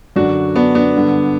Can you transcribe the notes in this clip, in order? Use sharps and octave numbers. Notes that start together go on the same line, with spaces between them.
F#2 D3 D4 F#4
B3 D4
B3 D4
G2 D3